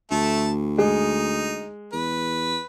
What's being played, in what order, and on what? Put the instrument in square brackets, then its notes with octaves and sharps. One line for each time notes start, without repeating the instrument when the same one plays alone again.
[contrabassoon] D2 [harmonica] A3 A5
[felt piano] G#3 [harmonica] D#4
[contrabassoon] E2 [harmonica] B4